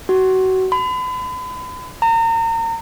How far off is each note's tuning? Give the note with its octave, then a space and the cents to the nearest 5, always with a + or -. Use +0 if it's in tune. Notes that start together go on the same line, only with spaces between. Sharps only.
F#4 +25
B5 +40
A#5 -35